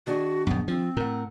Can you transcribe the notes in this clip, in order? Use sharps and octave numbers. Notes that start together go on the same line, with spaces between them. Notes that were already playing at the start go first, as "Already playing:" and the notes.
D#3 D4 F#4 G#4
A#1 F#2 B3
F3 C4
A2 A#4 F#5